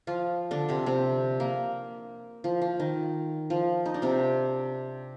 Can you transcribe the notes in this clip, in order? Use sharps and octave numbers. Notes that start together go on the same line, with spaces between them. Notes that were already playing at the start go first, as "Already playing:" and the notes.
F3 F4
D3 D4
C3 C4
C3 C4
A#3
F3
F3
D#3
F3
D#4
D4
C3 C4